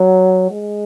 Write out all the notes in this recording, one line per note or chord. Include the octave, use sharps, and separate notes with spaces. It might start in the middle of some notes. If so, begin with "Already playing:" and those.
Already playing: F#3
G#3